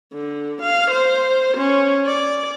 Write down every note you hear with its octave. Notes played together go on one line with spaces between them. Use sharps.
D3
F5
C5
C#4
D5